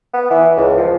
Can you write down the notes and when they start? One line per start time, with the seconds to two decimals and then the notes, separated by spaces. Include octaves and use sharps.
0.14 B3
0.31 E3
0.57 C#2
0.78 F3